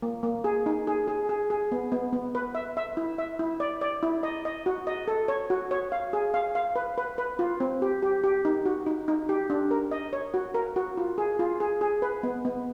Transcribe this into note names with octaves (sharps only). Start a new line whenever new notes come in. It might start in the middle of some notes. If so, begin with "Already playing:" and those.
A#3
A#3
G#4
D#4
G#4
G#4
G#4
G#4
B3
B3
B3
B4
E5
E5
E4
E5
E4
D5
D5
E4
D#5
D#5
F#4
D#5
A4
C#5
F#4
C#5
F5
G#4
F5
F5
B4
B4
B4
F4
C4
G4
G4
G4
D#4
F#4
D#4
D#4
G4
D4
A#4
D#5
C#5
F#4
A#4
F#4
F4
G#4
F4
G#4
G#4
B4
B3
B3